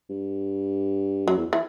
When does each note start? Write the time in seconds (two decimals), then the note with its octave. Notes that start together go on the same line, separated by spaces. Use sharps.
0.10 G2
1.27 F#2 F#3
1.37 E2
1.53 E3